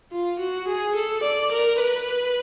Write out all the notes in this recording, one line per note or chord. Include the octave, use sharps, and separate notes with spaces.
F4
F#4
G#4
A4
D5
A#4
B4